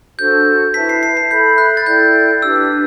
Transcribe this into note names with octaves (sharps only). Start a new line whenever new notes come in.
D4 F#4 A4 C5 G6
E4 B4 E5 A5 B6
C7
C7
B6
A4 E5 B5 G6
F#6
A6
E4 A4 D5 G5 G6
D4 G4 B4 E6